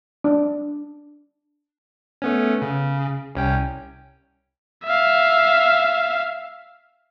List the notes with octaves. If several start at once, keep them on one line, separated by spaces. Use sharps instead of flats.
D4
A3 B3 C#4
C#3
C2 C#4 G5
E5 F5